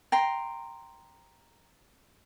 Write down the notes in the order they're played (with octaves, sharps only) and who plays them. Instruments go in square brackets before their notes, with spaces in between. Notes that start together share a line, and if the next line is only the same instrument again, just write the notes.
[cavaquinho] G5 A#5 C6